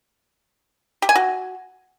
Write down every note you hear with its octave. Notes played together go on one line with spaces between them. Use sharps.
G4
G#5
F#4